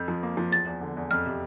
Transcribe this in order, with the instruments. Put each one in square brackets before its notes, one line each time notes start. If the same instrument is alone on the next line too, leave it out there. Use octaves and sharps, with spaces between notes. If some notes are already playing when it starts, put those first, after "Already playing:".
Already playing: [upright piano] F2 [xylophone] G6
[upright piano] F3
A#3
F3
[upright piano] E2 [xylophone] A6
[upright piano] E2
D3
E2
[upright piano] F2 [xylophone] F6
[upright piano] C3